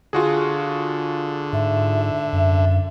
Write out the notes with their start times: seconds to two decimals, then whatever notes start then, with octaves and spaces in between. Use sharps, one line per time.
0.13 D3 F4 F#4 G#4
1.53 G#2 E5
2.33 F#2